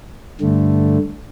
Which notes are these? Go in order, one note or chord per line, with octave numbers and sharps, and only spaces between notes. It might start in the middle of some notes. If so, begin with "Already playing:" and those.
G2 D3 A3